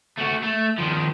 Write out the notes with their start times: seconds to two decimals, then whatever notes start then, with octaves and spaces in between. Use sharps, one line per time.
0.18 A3 F#4
0.43 A3
0.79 D#3 F3